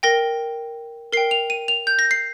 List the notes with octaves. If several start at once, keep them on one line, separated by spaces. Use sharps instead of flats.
A#4 G5 A#6
A#4 G5 C7
F7
D#7
F7
G6
A#6
C7